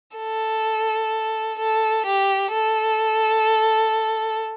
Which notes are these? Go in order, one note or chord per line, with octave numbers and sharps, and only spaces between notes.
A4
A4
G4
A4